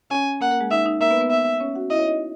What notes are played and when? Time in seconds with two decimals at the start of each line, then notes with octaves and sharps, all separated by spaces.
0.11 C#4 C#5 G#5
0.41 A#3 A#4 F#5
0.51 A#3 A#4
0.61 G#3 G#4
0.71 D#4 E5
0.86 D#4
1.01 A#3 A#4 E5
1.11 B3 B4
1.21 B3 B4
1.31 E5
1.60 C#4 C#5
1.75 F#4 F#5
1.90 E4 D#5 E5
1.99 C#5
2.06 D#4 D#5